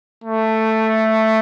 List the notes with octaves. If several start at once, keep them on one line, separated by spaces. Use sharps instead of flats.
A3